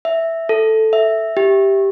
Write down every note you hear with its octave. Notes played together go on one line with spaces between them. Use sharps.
E5
A4
E5
G4